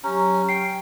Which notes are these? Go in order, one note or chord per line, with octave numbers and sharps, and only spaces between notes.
F#3 C#4 G4 A#5
G5 C7